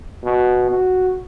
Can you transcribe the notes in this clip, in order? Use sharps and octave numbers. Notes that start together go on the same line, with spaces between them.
B2
F#4